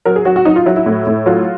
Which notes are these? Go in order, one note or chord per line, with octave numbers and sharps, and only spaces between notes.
F#3 A#4
G#4
F#3 F#4
F#4
F#3 D#4
F4
F#3 E4
E4
A2
A2
F#3 F4